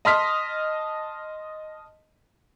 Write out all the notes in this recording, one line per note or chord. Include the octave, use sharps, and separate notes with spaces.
D#5 A5 C6 D#6 F6 B6